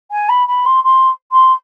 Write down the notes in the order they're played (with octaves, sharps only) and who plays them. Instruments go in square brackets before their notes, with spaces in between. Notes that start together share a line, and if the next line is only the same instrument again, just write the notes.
[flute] G#5
B5
B5
C6
C6
C6